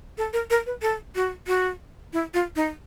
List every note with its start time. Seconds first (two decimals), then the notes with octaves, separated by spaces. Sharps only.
0.18 A4
0.33 A#4
0.50 A#4
0.66 B4
0.82 A4
1.15 F#4
1.47 F#4
2.13 E4
2.34 F4
2.56 D#4